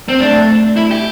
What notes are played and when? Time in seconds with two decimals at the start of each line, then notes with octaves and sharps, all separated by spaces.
0.09 C4
0.19 A3 D4
0.77 E4
0.91 G4